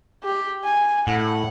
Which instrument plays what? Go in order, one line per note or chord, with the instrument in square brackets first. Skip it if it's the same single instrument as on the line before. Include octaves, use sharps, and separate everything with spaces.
[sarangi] G4
G#5
[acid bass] A2 [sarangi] F#5